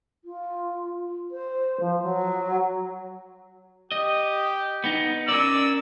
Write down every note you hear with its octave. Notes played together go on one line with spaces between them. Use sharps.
F4
C5
F3
F#3
G4 D#5
B3 D#4
C#4 A#4 D5 E6